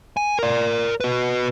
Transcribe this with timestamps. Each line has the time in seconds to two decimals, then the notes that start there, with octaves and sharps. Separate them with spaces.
0.17 G#5
0.39 A#4 D5
1.00 F#4 B4